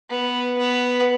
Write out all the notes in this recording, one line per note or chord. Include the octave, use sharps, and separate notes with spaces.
B3
B3